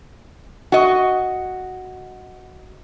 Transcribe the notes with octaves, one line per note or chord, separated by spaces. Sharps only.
F#4 D#5